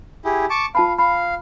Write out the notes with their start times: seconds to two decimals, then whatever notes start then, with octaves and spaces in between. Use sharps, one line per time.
0.25 E4 G4 G#4
0.50 A5 C#6 D6
0.75 F4 F5 A5 B5
0.99 F5 B5